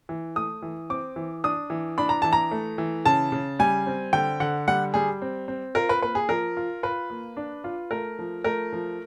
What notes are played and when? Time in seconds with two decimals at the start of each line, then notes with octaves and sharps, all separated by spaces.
0.09 E3
0.36 A3 D#6
0.62 E3
0.90 C4 D6
1.16 E3
1.44 D4 D#6
1.70 E3
1.98 D4 B5
2.09 A#5
2.22 E3 A5
2.33 A#5
2.51 A3
2.78 E3
3.05 C#3 A5
3.32 C#3
3.59 G3 G#5
3.86 C4
4.13 D3 G5
4.40 D3 F#5
4.68 G3 F#5
4.94 G3 G#4
5.22 C4
5.48 C4
5.75 F4 A#4
5.89 B4
6.02 A#3 B4
6.15 G#4
6.29 F3 A#4
6.57 F4
6.83 F4 B4
7.10 A#3
7.37 D4
7.64 F4
7.91 A3 A#4
8.19 F3
8.44 A3 A#4
8.73 F3